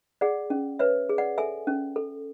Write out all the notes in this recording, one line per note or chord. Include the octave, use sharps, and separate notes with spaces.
G#4 D5 F#5
C#4
B4 C#5 E5
G#4
D5 F#5
A4 E5 G#5
C#4
A4